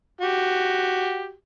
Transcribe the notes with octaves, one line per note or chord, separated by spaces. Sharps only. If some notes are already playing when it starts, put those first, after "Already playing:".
F#4 G4